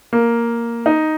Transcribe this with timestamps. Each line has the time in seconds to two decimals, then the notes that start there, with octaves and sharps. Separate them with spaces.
0.13 A#3
0.86 D#4